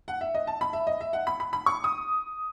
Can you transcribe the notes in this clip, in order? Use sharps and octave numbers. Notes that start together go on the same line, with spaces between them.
F#5
E5
D#5
A5
B5
E5
D#5
E5
F#5
B5
B5
B5
C#6
D#6